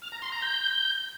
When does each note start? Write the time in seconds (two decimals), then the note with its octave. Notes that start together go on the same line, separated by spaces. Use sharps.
0.02 F6
0.12 A#5
0.22 C6
0.32 A#5
0.42 G6